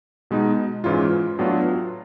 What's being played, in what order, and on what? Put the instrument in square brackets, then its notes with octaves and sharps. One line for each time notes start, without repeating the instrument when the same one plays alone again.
[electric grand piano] B2 G#3 B3 D#4
G#2 E3 G#3 C#4 F4
A2 F#3 B3 D4 F4